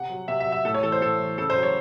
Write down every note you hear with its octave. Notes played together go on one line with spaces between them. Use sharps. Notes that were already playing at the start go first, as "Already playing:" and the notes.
Already playing: C3 F#5
F#3
C3 E5
E5
F#3
E5
A2 A4
C#5
E3 A4
C5
A2 A4
E3
C#3 A4
C5
F#3
C#5